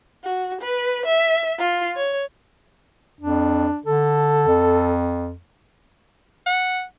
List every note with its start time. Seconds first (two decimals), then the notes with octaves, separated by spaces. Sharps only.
0.23 F#4
0.61 B4
1.05 E5
1.58 F4
1.96 C#5
3.20 F2 D4
3.86 D3 A4
4.47 F2
6.46 F#5